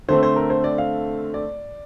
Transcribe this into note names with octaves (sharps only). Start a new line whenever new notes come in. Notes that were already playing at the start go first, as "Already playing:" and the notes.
D3 A3 C4 C5
C5
A#4
C5
D5
F5
D5